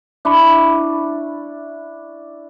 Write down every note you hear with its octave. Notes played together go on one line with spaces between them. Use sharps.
D4 E4 B5 C#6